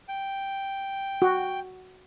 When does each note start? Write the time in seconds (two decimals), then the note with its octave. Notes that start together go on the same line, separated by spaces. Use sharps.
0.08 G5
1.22 F#4